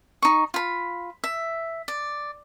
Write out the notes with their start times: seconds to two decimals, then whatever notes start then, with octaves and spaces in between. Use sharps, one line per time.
0.22 D#4 C#6
0.54 F4 B5
1.24 E5
1.88 D5